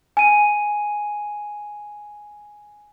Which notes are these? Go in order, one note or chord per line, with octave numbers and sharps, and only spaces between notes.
G#5 D#7